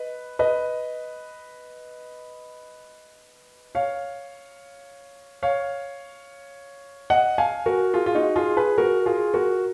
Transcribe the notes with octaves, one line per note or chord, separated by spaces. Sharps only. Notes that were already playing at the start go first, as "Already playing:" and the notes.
Already playing: B4 D#5
B4 D#5
C#5 F5
C#5 F5
D#5 F#5
F5 G#5
F#4 A#4
F4 G#4
F4
D#4 F#4
F4 G#4
G#4 B4
F#4 A#4
F4 G#4
F#4 A#4